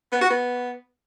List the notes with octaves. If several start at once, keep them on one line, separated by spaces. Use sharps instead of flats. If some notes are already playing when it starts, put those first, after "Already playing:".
B3
F#4
B3